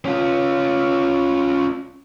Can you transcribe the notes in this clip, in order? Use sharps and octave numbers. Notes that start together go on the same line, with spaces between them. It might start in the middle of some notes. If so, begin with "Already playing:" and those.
C#4 F4